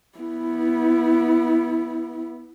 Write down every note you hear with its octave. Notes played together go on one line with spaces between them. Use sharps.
B3 E4